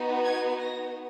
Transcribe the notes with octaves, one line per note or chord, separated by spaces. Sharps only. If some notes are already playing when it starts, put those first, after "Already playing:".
Already playing: B3 D#4 F#4
G#6
A#6